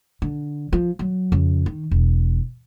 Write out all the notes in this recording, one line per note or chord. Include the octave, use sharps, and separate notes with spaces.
D3
F3
F#3
F2 C#3
D#3
E1